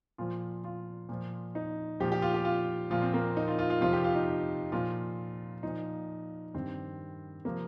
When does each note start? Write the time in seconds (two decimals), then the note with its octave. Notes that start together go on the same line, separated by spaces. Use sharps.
0.18 A#2 F3 F4
0.64 F4
1.09 A#2 F3
1.55 D#4
2.00 A#2 F3 G4
2.12 G4
2.22 F4
2.34 G4
2.45 F4
2.90 A#2 F3 F4
3.02 C4
3.14 A#3
3.37 D#4
3.48 F4
3.59 F4
3.70 F4
3.81 F2 C3 F3 F4
3.93 G4
4.04 F4
4.15 D#4
4.72 A#2 F3 F4
5.63 A#2 F3 D#4
6.54 G2 D#3 C4
7.45 C3 F3 A#3